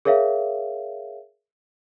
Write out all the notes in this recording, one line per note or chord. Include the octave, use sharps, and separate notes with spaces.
G#4 A#4 C#5 E5 F5